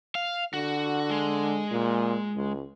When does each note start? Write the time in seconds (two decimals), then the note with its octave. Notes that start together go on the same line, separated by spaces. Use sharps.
0.15 F5
0.54 D3 F#4
1.10 G#3
1.71 A#2
2.35 C#2